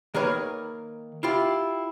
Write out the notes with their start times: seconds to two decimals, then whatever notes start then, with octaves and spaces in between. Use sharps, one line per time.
0.14 D#3 A#3 A#4 B4 C#5
1.23 E4 F4 G4